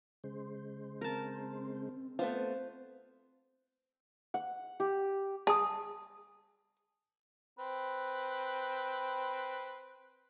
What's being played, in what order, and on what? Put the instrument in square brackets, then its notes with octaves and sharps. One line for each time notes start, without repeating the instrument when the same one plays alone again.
[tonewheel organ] C#3 G#3 C5
[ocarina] C4 [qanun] A#4 A5
[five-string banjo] A3 B3 F4 [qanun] C5
[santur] F#5
G4
[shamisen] G#4 [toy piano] A5 D#6
[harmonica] C4 B4